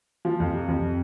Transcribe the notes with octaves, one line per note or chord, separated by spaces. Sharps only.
F3
F2
C3
F2